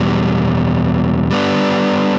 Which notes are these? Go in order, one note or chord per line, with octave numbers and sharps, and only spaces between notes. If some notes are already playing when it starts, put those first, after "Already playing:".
Already playing: E2 B2 G3
G3 B3 D4